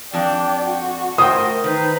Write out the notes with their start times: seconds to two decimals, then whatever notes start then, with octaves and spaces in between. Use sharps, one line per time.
0.13 F2 D4 D5 G5
0.65 F#4
1.18 A3 A#4 C5 G5 D#6
1.64 D#3 D#4 B4 C5 A#5